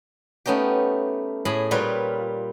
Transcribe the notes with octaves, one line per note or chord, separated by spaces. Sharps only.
A3 B3 C#4 D#4 G4
A2 G#4 G#5 B5
A#2 G3 F4 B4 C#5